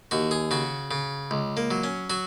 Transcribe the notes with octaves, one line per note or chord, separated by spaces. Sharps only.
D#2 F#4
G#4
C#3 F#4
C#3
C#2
A#3
F#3
C#4
F#3 F#4